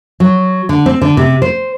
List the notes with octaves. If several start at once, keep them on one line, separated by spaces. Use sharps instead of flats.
F#3
D3
C4
D3
C3
C5